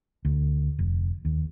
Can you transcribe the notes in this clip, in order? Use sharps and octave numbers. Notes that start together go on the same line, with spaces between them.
D2
F1
D#2